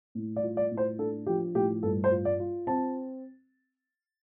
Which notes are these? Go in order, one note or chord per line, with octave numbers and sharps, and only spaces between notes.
A2
D5
F4
D5
A2
C5
D4 A4
F3 G4
A2 G4
G2 A4
C5
F4
D5
F4
C4 A5